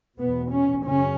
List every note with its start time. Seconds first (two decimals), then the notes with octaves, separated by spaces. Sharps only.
0.18 E2 B2 B3
0.51 C#4
0.84 F#2 C#3 C#4